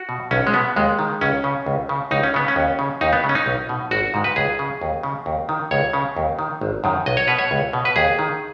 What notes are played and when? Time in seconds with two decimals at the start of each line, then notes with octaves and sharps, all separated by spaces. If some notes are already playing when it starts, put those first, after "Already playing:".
Already playing: F#4
0.09 B2
0.31 B1 C#4
0.47 G#3
0.54 B2 B3
0.76 D#2 G#3
0.99 D#3
1.21 C#2 C#4
1.44 C#3
1.66 C#2
1.89 C#3
2.11 C#2 D#4
2.23 C#4
2.34 C#3 B3
2.48 C#4
2.56 D#2
2.79 C#3
3.01 D#2 D#4
3.13 B3
3.24 C#3
3.29 C#4
3.35 D#4
3.46 B1
3.69 B2
3.91 G#1 F#4
4.14 G#2 D#3
4.24 B4
4.36 C#2 G#4
4.59 C#3
4.81 D#2
5.03 C#3
5.26 D#2
5.49 D#3
5.71 C#2 C#5
5.93 C#3
6.16 D#2
6.39 D#3
6.61 G#1
6.84 F#2 D#3
7.06 B1 D#5
7.17 C#5
7.28 B2 B4
7.39 C#5
7.51 C#2
7.73 B2
7.85 B4
7.96 D#2 G#4
8.19 D#3